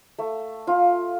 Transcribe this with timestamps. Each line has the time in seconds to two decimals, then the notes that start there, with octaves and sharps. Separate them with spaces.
0.18 A3
0.67 F4